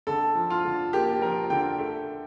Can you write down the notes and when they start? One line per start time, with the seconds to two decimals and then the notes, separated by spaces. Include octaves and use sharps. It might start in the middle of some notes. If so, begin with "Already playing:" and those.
0.07 D3 A4
0.35 F3
0.50 F4
0.65 D3
0.93 A#3 G4
1.21 F3 A#4
1.50 D3 G5
1.79 A3